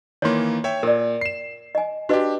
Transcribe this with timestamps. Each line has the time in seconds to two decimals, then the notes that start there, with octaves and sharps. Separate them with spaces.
0.22 D#3 E3 A#3 C#5 C6
0.64 C#5 E5 G5
0.83 A#2 A#4 D5
1.21 C7 E7
1.75 D#5 G#5
2.09 D4 F#4 G4 B4 D#5